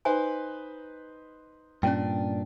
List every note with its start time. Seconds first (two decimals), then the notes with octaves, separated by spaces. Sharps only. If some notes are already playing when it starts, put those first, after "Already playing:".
0.05 D#4 B4 C5 G#5
1.83 G2 A#2 C#4 D4 G5